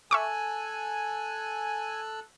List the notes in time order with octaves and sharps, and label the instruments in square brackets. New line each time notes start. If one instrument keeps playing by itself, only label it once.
[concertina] A4 E6 F#6 [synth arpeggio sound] E5 C#6 D6 [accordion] G#5